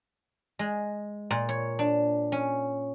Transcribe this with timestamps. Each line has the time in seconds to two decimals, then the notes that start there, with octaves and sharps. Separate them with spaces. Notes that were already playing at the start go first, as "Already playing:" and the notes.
0.59 G#3
1.31 A#2
1.49 C#5
1.79 D4
2.32 C#4